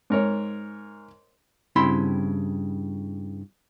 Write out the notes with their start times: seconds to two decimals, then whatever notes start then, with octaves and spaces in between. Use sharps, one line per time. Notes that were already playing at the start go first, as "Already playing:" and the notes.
0.10 G#2 A#4 C#5
1.76 G2 C#3 C4 E4 B5 C6